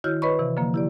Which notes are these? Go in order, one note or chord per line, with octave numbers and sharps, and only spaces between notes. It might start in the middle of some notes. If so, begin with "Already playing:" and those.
D#3 E4 F#4 C#5 F6 G6
B4 C#5 D#5 B5 C#6
C3 E3
D3 F3 A#3
E4 G4 D5